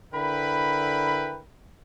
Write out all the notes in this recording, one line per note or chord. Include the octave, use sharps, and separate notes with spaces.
D3 E4 A#4 B4 G5 B5